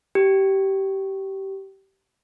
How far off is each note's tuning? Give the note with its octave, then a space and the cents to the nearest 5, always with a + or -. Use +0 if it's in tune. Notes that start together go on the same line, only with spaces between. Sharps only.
G4 -20